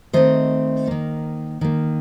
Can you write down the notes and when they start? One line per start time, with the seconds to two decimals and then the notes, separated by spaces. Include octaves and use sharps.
0.13 D#3 A3 C4 C5 D#5
0.87 D#3 A#3
1.61 D#3 A#3